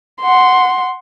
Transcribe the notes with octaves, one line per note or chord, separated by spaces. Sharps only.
F#5 C6